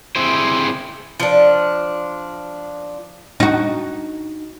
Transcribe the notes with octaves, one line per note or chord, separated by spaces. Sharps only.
C4 E4 G4 G#4 C5
F3 D4
D#4 F#4